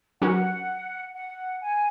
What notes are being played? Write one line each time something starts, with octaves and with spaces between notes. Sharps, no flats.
F#3 C#4 F#4 A#4 F#5
F#5
G#5